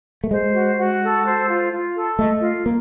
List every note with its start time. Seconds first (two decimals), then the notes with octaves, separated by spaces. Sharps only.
0.24 A3
0.31 G#3 C5
0.54 F#4
0.78 F#4
1.02 A4
1.24 C5
1.48 F4
1.71 F4
1.95 A4
2.19 A3 D#5
2.42 F4
2.66 A#3